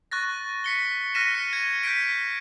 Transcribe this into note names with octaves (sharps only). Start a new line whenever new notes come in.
C#6 F#6 A6 A#6
B6 C#7 G7
F6 F#6 A#6 B6 D#7 E7
C#7
G#6 D#7
G6 G#6 B6 D7